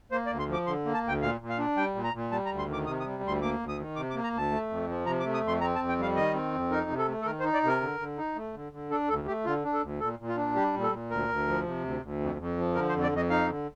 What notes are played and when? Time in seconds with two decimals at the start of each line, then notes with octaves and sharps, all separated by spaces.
0.12 A#3 C5
0.26 D5
0.30 D2
0.39 C6
0.48 F3
0.53 D6
0.67 D3 C6
0.85 A#3
0.94 A5
1.03 D2 G5
1.22 A#2 F5
1.41 A#2
1.49 F5
1.58 D4
1.77 G3 G5
1.95 A#2
2.04 A#5
2.14 A#2
2.31 G3 A5
2.46 A#5
2.50 D2
2.59 C6
2.68 D#3
2.73 D6
2.87 C3 D#6
3.00 D#6
3.05 G3
3.23 D2 C6
3.42 A#3 D6
3.59 D2
3.69 D#6
3.79 D#3
3.96 C3 D6
4.10 D6
4.15 A#3
4.24 A#5
4.33 D2 A5
4.51 A3
4.70 F2
4.88 F3
5.06 C3 A#5
5.20 D6
5.24 A3
5.34 D#6
5.43 F2 C6
5.61 C4 A#5
5.75 A5
5.79 F2
5.89 G5
5.98 G3 F5
6.16 D#3 D#5
6.34 C4
6.53 F2
6.71 D#4 A#4
6.90 C3
6.99 A4
7.08 A3
7.22 A4
7.26 D#3 A#4
7.40 C5
7.44 D#4
7.54 D5
7.63 C3 A#4
7.81 D3
8.00 D3
8.18 D#4
8.36 A3
8.54 D3
8.72 D3
8.91 D4 A4
9.09 D2 A4
9.27 A3 G4
9.46 D3 F4
9.64 D4
9.73 A4
9.82 D2
10.00 A#2 A4
10.19 A#2
10.28 F4
10.37 D4
10.55 G3 G4
10.74 A#2
10.83 A4
10.92 A#2
11.10 D2 A#4
11.29 D2
11.47 F3
11.66 C3
11.83 D2
12.02 D2
12.20 F2
12.39 F2
12.57 F3
12.75 D3 A#4
12.89 C5
12.93 F2
13.03 D5
13.12 F2 D#5
13.30 D#4 F5
13.49 D3